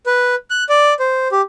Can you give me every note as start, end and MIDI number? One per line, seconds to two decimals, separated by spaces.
0.06 0.35 71
0.50 0.64 90
0.69 0.94 74
1.00 1.28 72
1.32 1.41 67